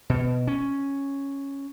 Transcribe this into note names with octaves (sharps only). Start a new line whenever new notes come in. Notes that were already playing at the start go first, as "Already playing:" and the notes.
B2
C#4